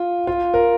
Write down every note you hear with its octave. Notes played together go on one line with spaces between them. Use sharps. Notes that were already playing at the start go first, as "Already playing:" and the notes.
Already playing: F4
F4
A#4